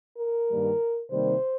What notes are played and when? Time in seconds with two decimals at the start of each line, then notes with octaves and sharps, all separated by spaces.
0.17 A#4
0.49 G2 D#3 G3 A#3
1.11 C3 D#3 G3 A#3 C5